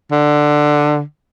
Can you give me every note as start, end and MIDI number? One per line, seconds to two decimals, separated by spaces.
0.12 1.01 50